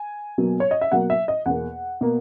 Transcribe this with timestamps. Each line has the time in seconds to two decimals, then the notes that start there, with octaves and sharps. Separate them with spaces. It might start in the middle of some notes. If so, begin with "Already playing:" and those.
Already playing: G#5
0.38 B2 F#3 A#3
0.60 C#5
0.71 D#5
0.81 E5
0.92 B2 F#3 A#3 F#5
1.10 E5
1.28 D#5
1.46 E2 B2 A#3 F#5
2.01 B2 A#3